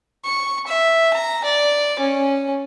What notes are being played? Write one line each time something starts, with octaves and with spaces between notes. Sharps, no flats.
C#6
E5
A#5
D5
C#4